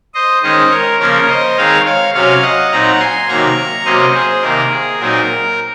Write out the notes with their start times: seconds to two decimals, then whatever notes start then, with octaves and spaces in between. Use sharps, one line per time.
0.14 C5 D#5
0.43 D#3 G#3 C#4 C5 D#5
0.71 A#4 C#5
1.00 C#3 F3 A#3 C#4 A#4 C#5
1.28 C5 D#5
1.57 D#3 G#3 C4 D#4 C#5 F5
1.85 C#5 F5
2.14 C3 F#3 C#4 C#5 F5
2.43 D#5 F#5
2.71 A#2 F#3 C4 D#4 F#5 A#5
3.00 G#5 C6
3.28 C3 D#3 F#3 A#3 A#5 C#6
3.85 C3 F#3 A#3 C#4 C5 D#5
4.14 G#4 C5
4.42 C3 D#3 A#3 A#4
4.71 G#4
5.00 A#2 F#3 C4 D#4 A#4